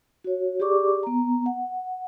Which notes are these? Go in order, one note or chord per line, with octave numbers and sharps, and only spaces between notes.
F#4 C#5
G4 G#4 D5 C#6 D6
B3 A#5
F#5